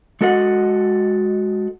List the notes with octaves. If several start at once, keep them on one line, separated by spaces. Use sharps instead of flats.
G#3 F#4 A4 D#5 F#5